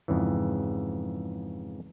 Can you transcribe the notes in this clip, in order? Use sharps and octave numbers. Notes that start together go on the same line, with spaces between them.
F2 G#2 C#3 E3